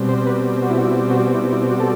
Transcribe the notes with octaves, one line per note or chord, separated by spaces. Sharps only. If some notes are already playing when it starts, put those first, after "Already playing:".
Already playing: B2 G3 C4
C5
B4
F#4
E4
F#4
E4
F#4
E4
E4
F#4
A4